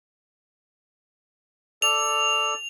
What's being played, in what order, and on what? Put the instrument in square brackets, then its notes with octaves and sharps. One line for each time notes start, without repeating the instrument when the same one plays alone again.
[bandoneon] A4 D5 [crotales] F7